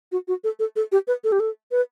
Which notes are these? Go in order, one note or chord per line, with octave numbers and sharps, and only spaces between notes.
F#4
F#4
A4
A4
A4
G4
B4
A4
G4
A4
B4